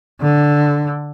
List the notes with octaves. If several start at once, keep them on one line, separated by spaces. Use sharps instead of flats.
D3